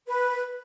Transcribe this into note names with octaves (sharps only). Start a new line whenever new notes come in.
B4